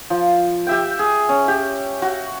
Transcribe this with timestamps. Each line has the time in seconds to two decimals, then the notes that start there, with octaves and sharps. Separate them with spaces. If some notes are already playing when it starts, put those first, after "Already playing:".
0.10 F3
0.67 G4 E5 G5
0.99 G#4
1.29 C#4
1.48 G4
2.02 F#4